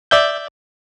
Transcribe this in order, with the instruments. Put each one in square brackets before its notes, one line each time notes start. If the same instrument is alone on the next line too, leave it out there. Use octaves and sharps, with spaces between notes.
[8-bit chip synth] D5 E5 G6